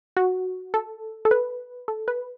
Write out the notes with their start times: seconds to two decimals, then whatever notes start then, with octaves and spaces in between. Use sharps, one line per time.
0.17 F#4
0.74 A4
1.25 A4
1.31 B4
1.88 A4
2.08 B4